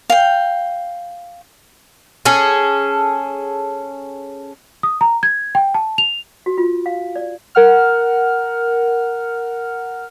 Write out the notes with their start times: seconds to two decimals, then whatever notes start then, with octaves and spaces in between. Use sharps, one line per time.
0.10 F5 G5
2.25 C#4 G#4 A4
4.83 D#6
5.01 A#5
5.23 G#6
5.55 G5
5.74 A5
5.98 F7
6.46 F#4
6.58 F4
6.86 F5
7.16 D5
7.55 A#4 F#5 F6